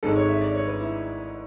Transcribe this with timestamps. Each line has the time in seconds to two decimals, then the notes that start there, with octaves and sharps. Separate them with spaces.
0.03 G#1 G#2 G#3 A4
0.15 C#5
0.29 E5
0.41 D5
0.54 C#5
0.67 B4
0.80 E4